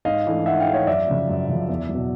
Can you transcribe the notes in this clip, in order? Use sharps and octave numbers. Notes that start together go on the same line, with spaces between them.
G#2 D#5 F5
E3 A3 D4
G#2 E5 F#5
F5 G5
E3 A3 D4
C#5 D#5
F#2 D5 E5
C#3 F3
F#2
C#3 F3
E2
F#3
B2